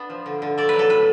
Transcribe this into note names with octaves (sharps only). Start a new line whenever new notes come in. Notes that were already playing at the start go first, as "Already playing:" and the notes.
Already playing: B3 D4 F#5
F3
D3
D3
A3 D5
F#3 B4
A4
A2 B4